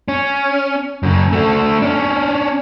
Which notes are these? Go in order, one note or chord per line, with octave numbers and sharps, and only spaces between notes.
C#4
F#2 C#3
A3 F#4
C#4 D4